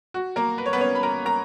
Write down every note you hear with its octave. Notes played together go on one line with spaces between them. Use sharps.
F#4
A#3 A#4
B4
C#5
B3 B4
C#4 C#5
B5
A#4 A#5
A#4 A#5